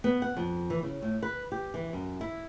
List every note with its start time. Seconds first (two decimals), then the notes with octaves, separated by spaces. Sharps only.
0.04 B3
0.22 F#5
0.37 F2
0.70 E3
0.83 C#3
1.02 A2
1.23 B4
1.52 G4
1.74 E3
1.93 F#2
2.21 E4